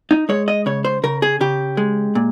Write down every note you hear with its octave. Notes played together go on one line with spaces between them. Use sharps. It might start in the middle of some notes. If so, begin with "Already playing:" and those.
D#4
G#3 C#5
D#5
C#3 C#5
C5
C#3 A#4
G#4
C#3 G4
G#3
A#2